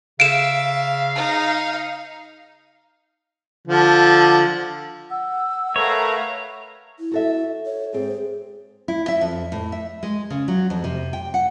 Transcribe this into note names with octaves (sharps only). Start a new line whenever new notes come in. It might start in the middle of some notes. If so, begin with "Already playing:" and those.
C#3 E5 F5 D7 E7
D#4
D3 F3
F#5 E6
A3 A#4 B4 C#5 E5 F5 A#5
E4
F#4 A4 E5
C#5
G#2 C4 G#4
E4
E5
F2
A2
E5
G#3
C#3
F#3
F2
C3
G5
F#5